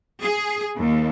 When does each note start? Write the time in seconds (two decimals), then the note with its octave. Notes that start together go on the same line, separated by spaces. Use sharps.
0.22 G#4
0.77 D#2